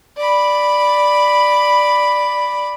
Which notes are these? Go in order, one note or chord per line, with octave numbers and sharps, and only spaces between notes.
D5 B5